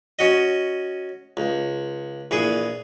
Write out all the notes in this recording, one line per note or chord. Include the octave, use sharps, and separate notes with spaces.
C#4 F#4 D#5
C#2
A#1 E3 G#4